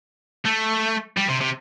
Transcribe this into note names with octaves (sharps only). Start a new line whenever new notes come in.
A3
G3
C3
C3